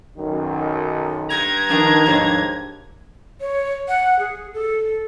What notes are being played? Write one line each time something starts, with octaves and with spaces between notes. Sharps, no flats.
B1 F#2 D#3
G2 A#5 G#6
D#3 F3 D4 A#4
D#2 G#2 F3 D4 C#5
C#5
F#5
G#4
A4